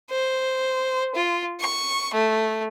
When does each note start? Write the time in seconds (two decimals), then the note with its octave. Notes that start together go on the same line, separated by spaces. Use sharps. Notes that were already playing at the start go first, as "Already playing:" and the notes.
0.11 C5
1.16 F4
1.60 C#6
2.15 A3